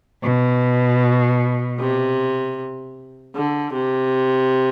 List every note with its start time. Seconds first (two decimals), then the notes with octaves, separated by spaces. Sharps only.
0.25 B2
1.80 C3
3.36 D3
3.74 C3